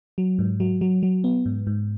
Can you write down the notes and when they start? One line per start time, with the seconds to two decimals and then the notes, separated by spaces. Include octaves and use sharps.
0.18 F#3
0.39 G#2
0.60 F#3
0.81 F#3
1.03 F#3
1.24 B3
1.46 G#2
1.67 G#2